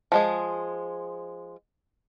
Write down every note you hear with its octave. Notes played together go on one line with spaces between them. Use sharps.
F3 G#3 G#4